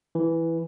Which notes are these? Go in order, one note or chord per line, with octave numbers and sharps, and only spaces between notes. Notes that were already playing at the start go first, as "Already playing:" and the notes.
E3